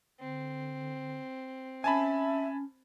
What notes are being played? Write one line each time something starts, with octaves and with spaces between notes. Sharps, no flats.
D3 C4
C#4 E5 G#5 A5 B5